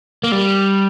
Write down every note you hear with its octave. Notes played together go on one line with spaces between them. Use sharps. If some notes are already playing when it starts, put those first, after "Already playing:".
A#3
G3